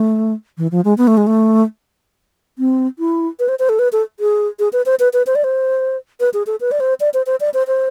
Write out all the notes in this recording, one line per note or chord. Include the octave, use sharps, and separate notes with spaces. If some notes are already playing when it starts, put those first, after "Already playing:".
Already playing: A3
E3
F3
G#3
B3
A3
G#3
A3
C4
E4
B4
C5
C5
A4
B4
A4
G#4
G#4
B4
C5
B4
B4
C5
D5
C5
B4
G#4
A4
B4
D5
C5
D5
C5
C5
D5
C5
C5